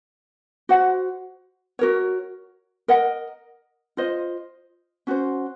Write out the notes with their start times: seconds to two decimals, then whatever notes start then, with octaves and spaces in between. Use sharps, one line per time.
0.69 F#4 C5 F#5
1.79 F#4 A#4 C#5
2.88 A#4 D#5 F#5
3.97 F4 C5 D#5
5.07 C#4 F#4 C5